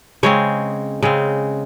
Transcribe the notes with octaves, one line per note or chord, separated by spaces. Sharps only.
C#3 G#3 C4 C#5
C#3 G#3 C4